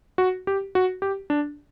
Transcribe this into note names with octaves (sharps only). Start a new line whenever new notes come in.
F#4
G4
F#4
G4
D4